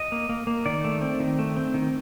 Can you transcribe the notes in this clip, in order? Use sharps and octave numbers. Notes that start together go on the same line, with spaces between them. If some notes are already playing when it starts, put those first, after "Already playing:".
Already playing: D#5
A#3
A#3
A#3
D#3 D5
A3
C4
D#3
A3
C4
D#3